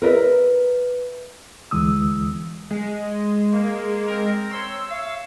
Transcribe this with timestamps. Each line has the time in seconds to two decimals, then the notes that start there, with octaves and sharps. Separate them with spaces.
0.02 A#4 B4 D#5 E5
1.71 D2 E3 G#3 D#6 E6
2.71 G#3
3.52 A#3
4.06 C4 A#4
4.51 C4 C#5 C6 E6
4.89 C#5 E5 F5